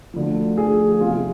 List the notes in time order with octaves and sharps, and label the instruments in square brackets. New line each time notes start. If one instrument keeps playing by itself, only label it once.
[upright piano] D2 D3 F3
D2 D3 F3 G#4
G#4
E2 C3 F3 F4